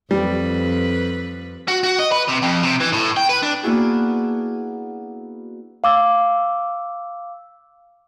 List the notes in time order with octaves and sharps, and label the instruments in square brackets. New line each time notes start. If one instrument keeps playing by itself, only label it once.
[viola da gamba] F2 B4 [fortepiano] G3
[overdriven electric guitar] F#4
F#4
D#5
B4
C3
F2
C3
E3
A2
G5
B4
D4
[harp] A#3 B3 D4 E4 F#4 G#4
[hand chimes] F5 D6 E6